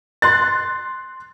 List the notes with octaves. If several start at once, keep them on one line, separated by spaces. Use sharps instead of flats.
C6 F#6 A6